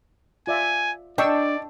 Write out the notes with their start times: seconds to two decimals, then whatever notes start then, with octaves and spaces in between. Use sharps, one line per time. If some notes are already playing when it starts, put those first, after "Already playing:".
0.47 F4 D5 E5 G#5
1.18 D4 D5 D#5 G5 C#6 E6